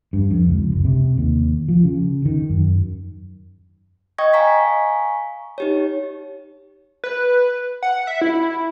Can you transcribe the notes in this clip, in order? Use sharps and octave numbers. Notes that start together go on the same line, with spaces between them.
G2
F2
C#2
F#1
C3
D#2
F3
C#3
D#3
F#2
D#5 G5 C#6 D#6 G#6 A#6
F5 G#5 A#5 C#6 B6
D#4 G4 C#5
B4
F#5
E5
E4